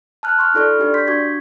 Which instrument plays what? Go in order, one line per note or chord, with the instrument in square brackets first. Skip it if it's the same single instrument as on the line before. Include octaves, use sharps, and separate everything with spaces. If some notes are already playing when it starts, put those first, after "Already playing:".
[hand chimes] A5 F6 F#6
C6 C#6 F6
D#4 F4 A4 D5 C#6 F6
D4 G4 D5
C6 G6 B6
D4 F#4 C#6 D6 G#6